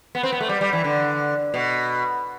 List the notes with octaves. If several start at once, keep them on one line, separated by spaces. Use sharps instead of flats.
B3
C4
B3
A3
G3
G3
E3
D3
B2